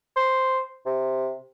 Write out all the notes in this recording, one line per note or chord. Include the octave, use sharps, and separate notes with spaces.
C5
C3